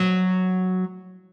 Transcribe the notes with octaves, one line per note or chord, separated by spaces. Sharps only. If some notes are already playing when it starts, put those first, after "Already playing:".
Already playing: F#3